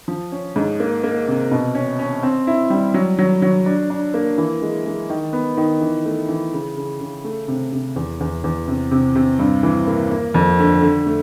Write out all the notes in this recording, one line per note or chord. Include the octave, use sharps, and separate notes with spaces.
F3
C#4
G#2
A#3
A#3
C3
B2
C#4
C#4
C4
E4
G3
F#3
F#3
F#3
D4
D4
A#3
E3
G#3
G#3
D#3
B3
D#3
E3
A3
E3
C#3
C#3
C#3
A3
C3
C3
E2
E2
E2
C3
C3
C3
G2
E3
A#3
A#3
F2
D3
D3
A3